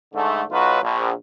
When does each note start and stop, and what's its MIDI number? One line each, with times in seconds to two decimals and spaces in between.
0.14 0.43 44
0.14 0.43 50
0.14 0.43 57
0.51 0.79 35
0.51 0.79 54
0.51 0.79 63
0.51 0.79 65
0.51 0.79 66
0.51 0.79 71
0.82 1.11 34